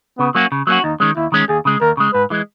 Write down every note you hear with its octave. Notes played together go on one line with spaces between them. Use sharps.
C#3 B3
F#3 A#3 C#4 F#4
C#3
F#3 A#3 C#4 F#4
D#2 D#4
D#3 G#3 C#4
D#2 E4
D#3 G#3 C#4
D#2 G#4
C#3 G#3
D#2 A#4
C#3 G#3
G#2 B4
E3 G#3